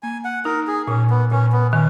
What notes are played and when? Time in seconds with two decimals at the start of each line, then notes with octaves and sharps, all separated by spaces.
0.03 A#3 G#5
0.25 F#5
0.45 D#4 A#4
0.67 G#4
0.88 A#2 C#4
1.10 B3
1.31 A#2 C#4
1.52 B3
1.73 D#3 C#4